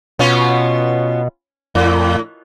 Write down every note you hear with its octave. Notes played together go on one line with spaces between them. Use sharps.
B2 B3 C#4 F4
F2 A2